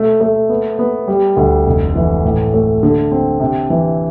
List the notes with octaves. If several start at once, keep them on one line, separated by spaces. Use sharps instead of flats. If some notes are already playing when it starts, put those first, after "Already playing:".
Already playing: B2 A3
A3
B3
B3
G3
D2
F1
E3
A2
A3
D3
C4
C3
E3